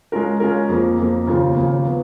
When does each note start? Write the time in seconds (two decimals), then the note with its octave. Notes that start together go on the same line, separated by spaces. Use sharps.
0.12 G#3 C#4 F4 A#4
0.40 G#3 C#4 F4 A#4
0.69 F2 F3 A#3
0.98 F2 F3 A#3
1.27 D#2 C#3 F3 A#3 F4
1.55 D#2 C#3 F3 A#3 F4
1.85 F3 B3